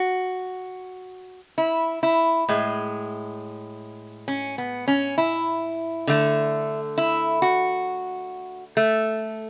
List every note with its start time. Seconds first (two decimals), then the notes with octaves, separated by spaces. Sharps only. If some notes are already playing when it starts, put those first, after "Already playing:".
Already playing: F#4
1.58 E4
2.03 E4
2.49 A2 G#3
4.28 C#4
4.58 B3
4.88 C#4
5.18 E4
6.07 D3 A3
6.98 E4
7.42 F#4
8.77 A3